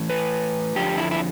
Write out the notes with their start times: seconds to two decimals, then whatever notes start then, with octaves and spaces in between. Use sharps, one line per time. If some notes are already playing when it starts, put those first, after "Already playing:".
Already playing: A2 E3
0.10 B4
0.75 F2 D3 F3 G4
0.98 E4
1.11 E4